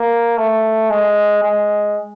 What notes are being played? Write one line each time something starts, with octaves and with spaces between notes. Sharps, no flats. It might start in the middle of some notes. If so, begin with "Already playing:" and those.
Already playing: A#3
A3
G#3
G#3